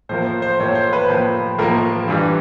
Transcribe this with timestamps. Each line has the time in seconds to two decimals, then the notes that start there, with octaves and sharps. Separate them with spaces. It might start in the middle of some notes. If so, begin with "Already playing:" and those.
0.09 A2 F3 A#3 C5
0.26 C5
0.42 C5
0.59 A2 F3 A#3 C#5
0.75 C5
0.93 B4
1.09 A2 F3 A#3
1.58 A2 F3 A#3 A#4
2.08 G2 E3 G3